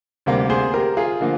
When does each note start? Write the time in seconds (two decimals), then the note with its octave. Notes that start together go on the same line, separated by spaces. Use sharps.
0.26 D2 C3 G3 A#3
0.50 G#4 C5
0.74 G4 A#4
0.97 F4 G#4
1.21 D3 F3 A#3